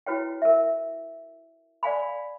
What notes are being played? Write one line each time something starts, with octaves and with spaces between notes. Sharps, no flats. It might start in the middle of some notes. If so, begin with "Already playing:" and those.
E4 F#4 B4 C#5 G5
A#4 E5
D5 F5 G#5 B5